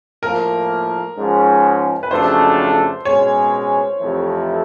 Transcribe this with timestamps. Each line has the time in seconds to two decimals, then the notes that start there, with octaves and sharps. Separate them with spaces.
0.23 A2 F3 A#3 A#4
1.17 G#2 F3 G#3 C#4
2.03 B4
2.11 F2 C#3 F#3 A3 D4 C5
3.05 B2 G#3 C#4 C#5
3.99 F2 C3 E3 A3